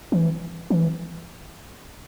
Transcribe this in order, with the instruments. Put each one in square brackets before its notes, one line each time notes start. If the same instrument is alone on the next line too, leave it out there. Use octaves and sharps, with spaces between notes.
[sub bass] E3
E3